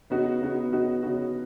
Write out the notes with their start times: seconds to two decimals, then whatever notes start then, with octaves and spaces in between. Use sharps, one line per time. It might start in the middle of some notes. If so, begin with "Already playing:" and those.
0.10 C#3 B3 D#4 F#4
0.41 C#3 B3 D#4 F#4
0.71 C#3 B3 D#4 F#4
1.03 C#3 B3 D#4 F#4